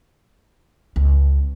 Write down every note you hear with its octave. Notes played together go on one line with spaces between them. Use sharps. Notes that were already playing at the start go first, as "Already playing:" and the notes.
C#2